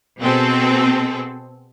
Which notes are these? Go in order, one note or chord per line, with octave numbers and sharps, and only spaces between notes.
B2 C4 G#4 A4